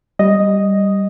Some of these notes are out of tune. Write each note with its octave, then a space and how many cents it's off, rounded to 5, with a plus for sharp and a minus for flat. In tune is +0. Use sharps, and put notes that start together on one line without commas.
G3 +0 D#5 +0